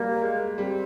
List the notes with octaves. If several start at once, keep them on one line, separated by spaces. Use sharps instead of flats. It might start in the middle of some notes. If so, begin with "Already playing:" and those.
Already playing: G3 A#3
G#3
G3 C4